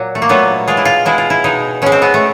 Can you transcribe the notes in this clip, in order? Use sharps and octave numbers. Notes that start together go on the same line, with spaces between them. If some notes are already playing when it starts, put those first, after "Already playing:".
Already playing: A#2 F#3
A3
A#3
A#2 F#3 A3 B3
B2 G#3 F4
E4
F4
B2 G#3 E4
F4
E4
B2 G#3 D#4
B2 G#3 C#4
C4
B3
A3